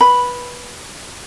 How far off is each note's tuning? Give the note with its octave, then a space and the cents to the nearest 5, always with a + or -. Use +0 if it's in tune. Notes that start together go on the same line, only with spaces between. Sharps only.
B4 -20 B5 +0